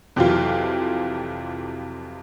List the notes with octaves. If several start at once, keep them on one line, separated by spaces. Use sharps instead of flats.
F2 C3 E3 F#3 F4